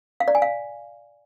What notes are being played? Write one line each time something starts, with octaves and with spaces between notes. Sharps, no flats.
F5
D5
G#5
F5